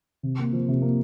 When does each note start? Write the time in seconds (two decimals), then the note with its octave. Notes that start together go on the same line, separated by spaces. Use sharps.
0.23 C3
0.39 A#3
0.53 F3
0.68 C3
0.82 A#3